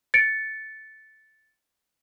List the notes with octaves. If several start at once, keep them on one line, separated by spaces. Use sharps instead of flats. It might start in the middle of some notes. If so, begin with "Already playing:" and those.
A6 C#7 D7